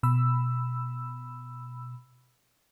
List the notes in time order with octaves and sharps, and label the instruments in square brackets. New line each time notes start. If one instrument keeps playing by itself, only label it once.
[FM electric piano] B2 B5 E6